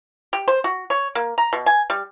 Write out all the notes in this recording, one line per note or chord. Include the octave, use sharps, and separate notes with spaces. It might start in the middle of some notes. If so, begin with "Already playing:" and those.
G4
C5
F#4
C#5
A#3
A#5
B2
G#5
G3